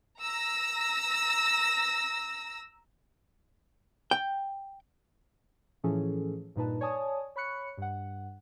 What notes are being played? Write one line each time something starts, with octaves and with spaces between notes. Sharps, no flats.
A#5 E6 A#6
G5
A2 E3 F3 C#4 G#4 A4
G2 A#2 D#4 B4 A5
C#5 D5 G#5 A5 D#6
C#5 B5 C#6 F#6 C#7
G2 F#5